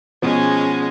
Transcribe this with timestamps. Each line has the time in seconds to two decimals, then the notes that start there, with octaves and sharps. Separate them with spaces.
0.22 B2 F3 G#3 C#4